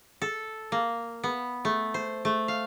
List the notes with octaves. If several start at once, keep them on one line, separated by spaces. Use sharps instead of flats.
A4
A#3
B3
A3
C5
A3
F5